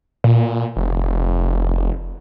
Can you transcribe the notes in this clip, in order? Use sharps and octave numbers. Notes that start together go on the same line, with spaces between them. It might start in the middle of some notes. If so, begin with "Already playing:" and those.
A#2
F1